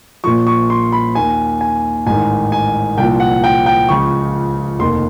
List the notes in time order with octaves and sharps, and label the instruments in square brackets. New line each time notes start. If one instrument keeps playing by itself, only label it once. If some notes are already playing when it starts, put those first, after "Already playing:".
[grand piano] A#1 A#2 F3 C#6
C#6
C6
B5
D#2 D#3 G#5
G#5
A1 G#2 D#3 G#5
G#5
C2 A#2 F3 G5
F#5
G5
G5
C#2 C#3 F3 C#6
F1 D#2 D#3 C6